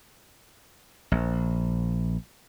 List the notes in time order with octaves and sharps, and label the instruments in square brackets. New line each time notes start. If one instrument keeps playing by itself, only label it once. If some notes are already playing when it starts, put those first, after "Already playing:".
[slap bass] A#1